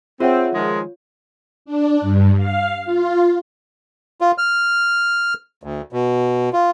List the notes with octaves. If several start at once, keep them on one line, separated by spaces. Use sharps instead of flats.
C4 F4 G#4 C#5 E5 F#5
D#3 F3 G#3
D4
G2
F5
F4
F4
F6
D2
B2
F4